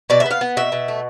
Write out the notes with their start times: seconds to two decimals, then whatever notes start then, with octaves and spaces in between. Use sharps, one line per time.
0.10 B2 D5
0.20 E5
0.26 B3 F5
0.41 B3
0.57 B2 E5
0.72 B2
0.88 A3